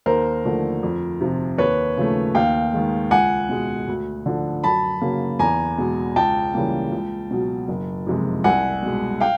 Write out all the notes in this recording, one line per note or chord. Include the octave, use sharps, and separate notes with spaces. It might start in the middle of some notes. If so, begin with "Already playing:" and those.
D#2 A#4 C5
D3 F3 A3
F2
C3 F3
D#2 B4 C#5
C#3 F3 A3
D#2 F5 G5
D#3 G#3
C#2 F#5 G#5
B2 G#3
D2
D3 F3
F#2 A5 B5
C#3 F#3 A#3
E2 G#5 A#5
B2 G#3
C#2 G5 A5
C#3 E3 G3 A#3
C#2
B2 F#3
F#1
F2 C3 F3 G#3
C2 F#5 G#5
B2 G#3
F5 G5